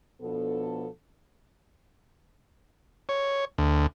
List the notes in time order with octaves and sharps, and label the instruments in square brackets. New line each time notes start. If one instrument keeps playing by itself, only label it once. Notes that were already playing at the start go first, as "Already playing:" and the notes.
[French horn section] B2 F3 B3 D4 A4
[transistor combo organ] C#5
D2